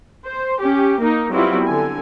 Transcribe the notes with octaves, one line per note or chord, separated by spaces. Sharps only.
C5
C#4 G4
A#3 D#4
F#3 G3 B3 C4 E4 F4
D3 G#5